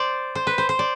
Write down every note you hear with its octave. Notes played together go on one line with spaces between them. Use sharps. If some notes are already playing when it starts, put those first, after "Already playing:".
Already playing: C5 D5
C5
B4
C5
C5
D5